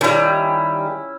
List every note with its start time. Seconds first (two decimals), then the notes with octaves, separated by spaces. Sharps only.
0.01 D#3 G3 C#4 E4